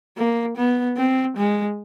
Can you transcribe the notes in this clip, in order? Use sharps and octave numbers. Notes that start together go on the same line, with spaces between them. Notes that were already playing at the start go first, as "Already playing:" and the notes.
A#3
B3
C4
G#3